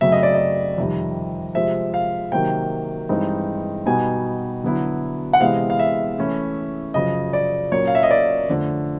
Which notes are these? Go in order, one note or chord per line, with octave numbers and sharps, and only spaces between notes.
F#2 C#3 F#3 A3 C4 E5
D#5
D5
D#5
F2 C3 D#3 G3
C3 F3 G#3 E5
F5
C3 D#3 F#3 A#3 G5
G2 E3 G#3 C4 D#4
B2 G3 B3 D#4 G#5
D3 F#3 B3 E4
F#5
C3 E3 G#3 B3 F5
F5
E5
E3 A3 C#4 E4
F#2 C#3 F3 D#5
D5
A#2 F#3 A#3 C#4 C#5
F5
E5
D#5
D5
F2 D3 F3 A3